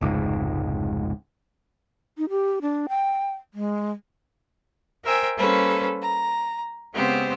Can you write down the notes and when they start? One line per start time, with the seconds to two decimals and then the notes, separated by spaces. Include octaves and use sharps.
0.01 F1 C#2 G#2
2.18 D#4
2.30 G4
2.62 D4
2.89 G5
3.54 G#3
5.04 A#4 C5 E5 G5 G#5
5.37 G3 A#3 C#4 A4 B4 C5
6.01 A#5
6.95 C#3 G#3 B3 C4 G4 C5